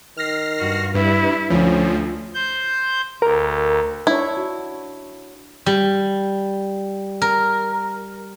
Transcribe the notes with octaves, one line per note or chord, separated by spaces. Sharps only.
D#3 F6 A#6 C7
G2 F#4
G2 E4 B4
D2 F3 C#4
C5 G6
D2 A#4
D4 E4 C#5
F#4
G3
A#4